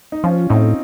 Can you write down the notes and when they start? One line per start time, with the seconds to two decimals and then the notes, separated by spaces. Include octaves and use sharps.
0.12 D#4
0.24 F3 C#4 F4
0.50 A2 C4 D#4